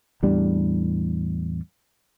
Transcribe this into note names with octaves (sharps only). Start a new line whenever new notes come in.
E2 A2 G3 D4